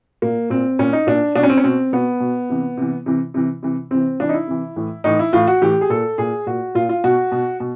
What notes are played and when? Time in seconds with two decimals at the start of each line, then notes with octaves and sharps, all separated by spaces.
0.22 A#2 A#3
0.50 A#2 C4
0.79 A#2 C#4
0.93 D#4
1.07 A#2 D4
1.36 B2 D4
1.43 C#4
1.50 C4
1.57 C#4
1.64 B2 C4
1.93 B2 B3
2.20 B2
2.50 C3 E3
2.77 C3 E3
3.06 C3 E3
3.34 C3 E3
3.63 C3 E3
3.91 C3 E3 C4
4.19 C3 E3 D4
4.29 D#4
4.34 E4
4.47 C3 E3
4.76 A2 E3
5.04 A2 E3 D#4
5.19 E4
5.33 A2 E3 F4
5.47 F#4
5.62 A2 E3 G4
5.81 G#4
5.90 A#2 A4
6.18 A#2 G#4
6.46 A#2 F#4
6.75 A#2 F4
6.89 F4
7.04 B2 F#4
7.32 B2
7.60 B2